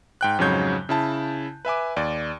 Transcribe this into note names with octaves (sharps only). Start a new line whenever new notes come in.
G#2 G5 F#6
F2 G#2 C#3 F#3 C#5 G6
C#3 E4 A5
B4 E5 G#5 D6
D#2 D5